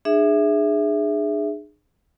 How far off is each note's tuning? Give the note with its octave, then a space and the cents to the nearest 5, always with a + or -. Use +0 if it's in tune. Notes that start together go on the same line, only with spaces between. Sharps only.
D4 +45 G#4 +0 E5 +0